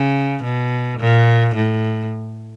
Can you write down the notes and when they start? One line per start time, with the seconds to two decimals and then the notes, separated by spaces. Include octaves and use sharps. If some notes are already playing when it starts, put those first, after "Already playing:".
Already playing: C#3
0.43 B2
1.00 A#2
1.55 A2